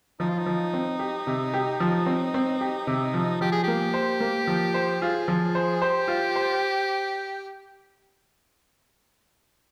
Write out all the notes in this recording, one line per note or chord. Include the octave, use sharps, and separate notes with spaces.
F3 D#4
F4
D#4
F3
C4
G4
C3
G4
F3
C4
C4
G4
C3
F3
F3 G4
G#4
A#3 G4
C5
A#3
F3
C5
F4 G#4
F3
C5
G4 C5
F4
C5